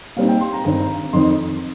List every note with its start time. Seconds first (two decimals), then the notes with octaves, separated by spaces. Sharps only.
0.16 A#2 G3 C4 D#4 F5
0.29 G5
0.41 C6
0.53 A#5
0.64 G2 D#3 C4 A#5
1.13 F2 D#3 C4 D#4 C6